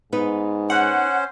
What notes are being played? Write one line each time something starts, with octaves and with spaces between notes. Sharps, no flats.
G#2 B3 D#4 B4
C#4 C5 F#5